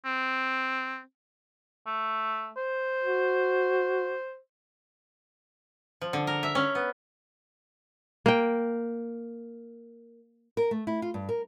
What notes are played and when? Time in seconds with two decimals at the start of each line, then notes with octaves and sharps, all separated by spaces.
0.06 C4
1.86 A3
2.57 C5
3.04 F#4
6.02 F3
6.13 D3
6.27 A#4
6.43 E5
6.55 C#4
6.75 B3
8.26 A#3 G5
10.57 A#4
10.71 A3
10.87 E4
11.02 F4
11.14 G2
11.29 A#4